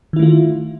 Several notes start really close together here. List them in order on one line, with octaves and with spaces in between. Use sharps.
D#3 E4 A3 F4